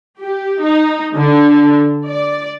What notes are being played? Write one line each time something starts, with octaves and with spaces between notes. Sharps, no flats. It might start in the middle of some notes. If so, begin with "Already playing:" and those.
G4
D#4
D3
D5